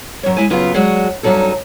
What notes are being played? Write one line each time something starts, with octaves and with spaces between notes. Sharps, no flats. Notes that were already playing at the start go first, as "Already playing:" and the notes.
F#2 C#5
G#3 E4 G#5
F#2 C#3 B3 F4
F#3 G#3 D4 F#4
G2 F#3 G3 C#4 D#4 A4